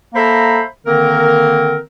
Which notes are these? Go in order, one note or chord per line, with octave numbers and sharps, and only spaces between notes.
A#3 A4 C5 E5 A#5 B5
D3 D#3 A#3 C4 A#4